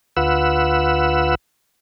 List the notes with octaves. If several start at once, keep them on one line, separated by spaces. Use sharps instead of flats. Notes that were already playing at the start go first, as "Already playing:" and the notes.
D2 F4 B4 F#5 E6